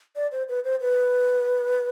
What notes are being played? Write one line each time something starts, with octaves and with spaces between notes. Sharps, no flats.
D5
C5
B4
C5
B4